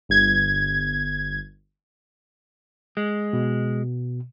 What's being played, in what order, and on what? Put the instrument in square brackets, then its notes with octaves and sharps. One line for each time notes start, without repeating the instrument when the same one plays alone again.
[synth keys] G1 G#6
[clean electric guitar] G#3
[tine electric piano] B2